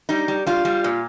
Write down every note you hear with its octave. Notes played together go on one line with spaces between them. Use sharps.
G3 D#4
G3
G3 F4
G3
A#2